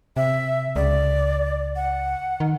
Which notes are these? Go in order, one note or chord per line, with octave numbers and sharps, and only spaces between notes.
C3 E5
C#2 D5
F#5
D#3